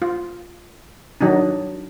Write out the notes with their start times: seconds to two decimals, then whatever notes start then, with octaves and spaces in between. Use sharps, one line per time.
0.02 F4
1.21 D#3 F#3 D4 D#4